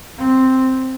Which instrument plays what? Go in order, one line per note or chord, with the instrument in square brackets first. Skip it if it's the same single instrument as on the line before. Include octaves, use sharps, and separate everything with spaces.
[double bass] C4